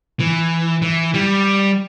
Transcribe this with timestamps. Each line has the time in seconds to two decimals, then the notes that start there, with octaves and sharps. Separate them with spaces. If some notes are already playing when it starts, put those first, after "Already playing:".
0.20 E3
0.82 E3
1.14 G3